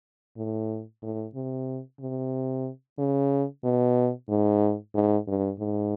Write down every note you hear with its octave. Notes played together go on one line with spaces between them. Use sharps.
A2
A2
C3
C3
C#3
B2
G#2
G#2
G2
G#2